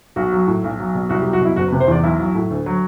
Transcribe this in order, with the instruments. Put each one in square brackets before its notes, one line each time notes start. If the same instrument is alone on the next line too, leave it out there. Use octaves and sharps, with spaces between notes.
[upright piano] B1 F#4
F#3
A2
B1
F#3
B2
C2 F#4
G4
F#3
F#4
B2 E4
F#1 F#4
B4
C3
C5
E2 D5
B1 E4
F#3
A2
D2
F#3